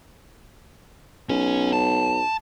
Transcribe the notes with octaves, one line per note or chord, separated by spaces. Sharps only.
B1 C#4
A5